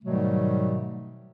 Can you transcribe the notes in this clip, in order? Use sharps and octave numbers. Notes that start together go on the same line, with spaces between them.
G#2 B2 D#3 F#3 G3 A3